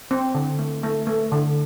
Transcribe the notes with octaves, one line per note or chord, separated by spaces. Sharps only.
C4
D3
A3
A3
A3
D3